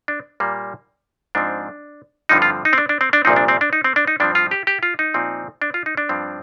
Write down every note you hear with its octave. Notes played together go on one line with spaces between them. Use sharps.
D4
A#2 G3 A#3
G#2 F3 C4 D4
G2 D3 F3 C4 D#4
F4
D#4
C4
D4
D4
C4
D4
C2 A#2 F3 C4 D#4
D4
C4
D4
D#4
C4
D4
D#4
G2 F3 C4 D4
F4
G4
G4
F4
D#4
A#2 F3 C4
D4
F4
D#4
D4
G2 F3 C4